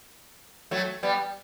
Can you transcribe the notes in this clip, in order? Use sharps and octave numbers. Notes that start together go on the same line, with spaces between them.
F#3 A3
G3 B3